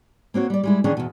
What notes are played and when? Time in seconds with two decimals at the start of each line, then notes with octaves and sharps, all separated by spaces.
0.34 A#3 C4 F#4 C#5
0.50 G3 D5
0.63 G3 G#3 E4
0.84 D#3 E3 C#4 D4 G#4
0.97 E2 B2